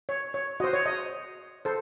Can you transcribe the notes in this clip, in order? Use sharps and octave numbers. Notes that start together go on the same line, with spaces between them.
C#5
C#5
F#4 C5 D#5
C#5
D#5
A4 C5